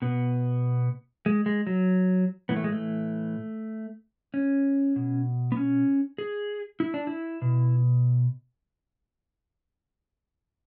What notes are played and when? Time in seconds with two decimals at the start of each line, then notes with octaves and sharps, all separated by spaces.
0.02 B2 B3
1.26 G#3
1.46 G#3
1.67 F#3
2.49 A2 E3 B3
2.57 A3
2.64 G#3
2.72 A3
4.34 C#4
4.96 B2
5.52 B3
5.57 C#4
6.18 G#4
6.80 E4
6.94 D4
7.07 E4
7.42 B2